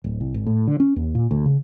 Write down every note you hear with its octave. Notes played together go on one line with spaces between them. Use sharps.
D1
C2
G#1
A2
D3
C#4
D#2
A#2
D2
C#3